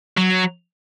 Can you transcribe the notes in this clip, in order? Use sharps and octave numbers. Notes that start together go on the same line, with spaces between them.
F#3